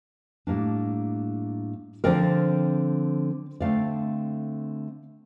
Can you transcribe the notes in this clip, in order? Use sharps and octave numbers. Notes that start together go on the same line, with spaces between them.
A2 G3 A#3 D4
D3 F3 C4 A#4 D5
D3 A3 C4 D5 F5